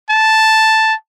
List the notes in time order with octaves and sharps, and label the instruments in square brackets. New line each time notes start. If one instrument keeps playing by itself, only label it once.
[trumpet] A5